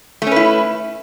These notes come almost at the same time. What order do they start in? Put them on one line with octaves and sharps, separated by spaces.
A3 C#4 B4 E4